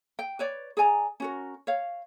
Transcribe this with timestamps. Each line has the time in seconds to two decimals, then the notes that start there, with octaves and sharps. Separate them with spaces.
0.19 G5
0.39 B4 C#5 D5
0.77 G#4 D5 G#5 A#5
1.20 C#4 F#4 A#4
1.67 C#5 F5